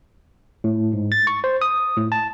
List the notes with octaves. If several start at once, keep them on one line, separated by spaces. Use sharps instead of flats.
A2
G#2
A6
C#6
C5
D#6
A2
A5